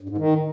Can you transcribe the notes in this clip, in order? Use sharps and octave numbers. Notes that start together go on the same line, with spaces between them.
G2
G#2
D#3